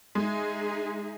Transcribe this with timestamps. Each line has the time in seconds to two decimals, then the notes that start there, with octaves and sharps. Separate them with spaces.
0.15 G#3 D#4 G#4 E5